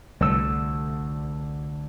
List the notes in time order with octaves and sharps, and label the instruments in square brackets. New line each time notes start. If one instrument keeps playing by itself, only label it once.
[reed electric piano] C2 E6 [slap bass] D3 A3